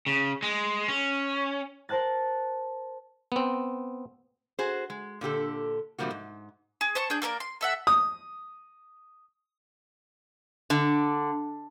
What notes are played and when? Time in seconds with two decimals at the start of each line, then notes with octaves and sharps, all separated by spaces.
0.07 C#3
0.42 G#3
0.88 C#4
1.89 A#4 C5 A5 F#6 A6
3.32 B3 C4
4.59 F#4 G#4 C5
4.90 G#3
5.21 A#2 D3 G4 A4
5.98 G2 C3 F3 G3 A#3 F#4
6.10 G#2
6.81 G#4
6.95 C5 A5 C#6
7.10 D4 G#4 G6
7.22 A#3 A4 A#4 D5
7.40 C6
7.61 A4 E5 F#5
7.87 D#6
10.70 D3